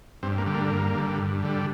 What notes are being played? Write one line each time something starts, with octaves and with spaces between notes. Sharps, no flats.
G2 C4
A#3
D3 G3
A#3
G2 A#3
D3 G3
G2
D3 G3